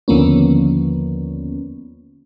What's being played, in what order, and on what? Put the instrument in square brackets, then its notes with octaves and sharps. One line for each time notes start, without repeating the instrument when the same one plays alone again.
[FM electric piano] D#2 D3 F3 A#3 B3 C#4